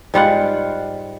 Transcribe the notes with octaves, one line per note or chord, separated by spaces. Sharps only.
G#2 G3 F4 F#5